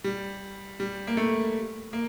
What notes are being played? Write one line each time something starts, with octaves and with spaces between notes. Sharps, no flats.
G3
G3
A#3
A3
A#3